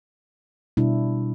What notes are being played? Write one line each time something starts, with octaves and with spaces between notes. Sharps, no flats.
B2 G3 D4 E4